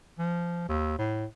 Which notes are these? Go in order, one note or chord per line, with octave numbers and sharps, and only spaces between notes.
F3
D#2
A2